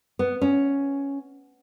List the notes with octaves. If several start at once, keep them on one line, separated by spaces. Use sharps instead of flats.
B3
C#4